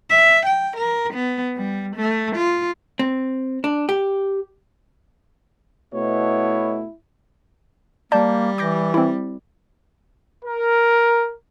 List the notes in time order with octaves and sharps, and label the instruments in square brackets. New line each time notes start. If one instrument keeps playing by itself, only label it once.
[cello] E5
G5
A#4
B3
G3
A3
F4
[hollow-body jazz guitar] C4
D4
G4
[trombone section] B2 [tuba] A3 [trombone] E4 [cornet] C#5
[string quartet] G3 [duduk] A#3 [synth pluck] D5 A5 G6
[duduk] E3 [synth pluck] D6 G6 A#6
[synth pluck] C4 E4
[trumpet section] A#4